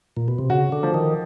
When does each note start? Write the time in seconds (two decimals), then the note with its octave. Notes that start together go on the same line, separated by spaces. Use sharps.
0.17 A#2
0.28 B2
0.39 C3
0.50 C#3 F#4
0.72 D3
0.83 F3
0.94 D#3